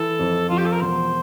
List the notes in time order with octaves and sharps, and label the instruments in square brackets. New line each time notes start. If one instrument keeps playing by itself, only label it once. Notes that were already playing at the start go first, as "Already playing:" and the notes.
Already playing: [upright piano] E3 [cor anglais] A4
[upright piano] F2
[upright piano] F3 [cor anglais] F4
[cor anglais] G4
A4
A#4
[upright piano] E1 [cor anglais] C5